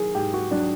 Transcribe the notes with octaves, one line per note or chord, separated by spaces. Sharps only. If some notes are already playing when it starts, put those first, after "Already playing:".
Already playing: D#3 F#3 G#4 A#4
G#2 G4
F#4
F#3 D4